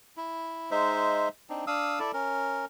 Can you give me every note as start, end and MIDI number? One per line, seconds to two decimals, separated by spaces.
0.17 0.70 64
0.71 1.29 56
0.71 1.29 63
0.71 1.29 72
0.71 1.29 76
1.50 1.65 60
1.50 1.65 62
1.50 1.65 63
1.67 1.99 62
1.67 1.99 77
1.67 1.99 87
1.67 1.99 88
1.99 2.12 64
1.99 2.12 69
1.99 2.12 74
2.13 2.65 61
2.13 2.65 70